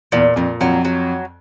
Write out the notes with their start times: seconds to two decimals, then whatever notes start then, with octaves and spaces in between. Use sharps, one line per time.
0.12 E2 A#2
0.36 F2 A#2
0.61 F2 F#3
0.85 F#3